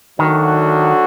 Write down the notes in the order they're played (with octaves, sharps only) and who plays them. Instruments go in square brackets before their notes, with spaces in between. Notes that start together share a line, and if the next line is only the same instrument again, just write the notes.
[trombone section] D2 D3 F#3 D4 F#4 [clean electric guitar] D#3